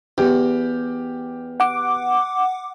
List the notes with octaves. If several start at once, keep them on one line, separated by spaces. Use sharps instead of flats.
E2 G4
F#5 D6